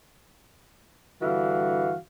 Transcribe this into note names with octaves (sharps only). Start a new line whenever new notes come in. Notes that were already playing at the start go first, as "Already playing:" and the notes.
G2 D3 E3 F#4 F5